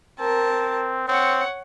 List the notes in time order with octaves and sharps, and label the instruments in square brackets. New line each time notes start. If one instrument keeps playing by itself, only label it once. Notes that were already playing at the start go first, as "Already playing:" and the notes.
[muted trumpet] C4 [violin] A#4 A5
[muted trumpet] C4 [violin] C#5 F#5